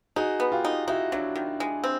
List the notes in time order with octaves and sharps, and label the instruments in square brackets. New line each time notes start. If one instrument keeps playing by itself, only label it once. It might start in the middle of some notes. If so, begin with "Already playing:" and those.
[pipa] D#4 [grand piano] F#4 G#4
[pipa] B3
[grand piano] F4 G4
[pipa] D#4
[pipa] D#4 [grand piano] E4 F#4
[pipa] F#3 [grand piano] D4 E4
[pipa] D#3
G#3
C4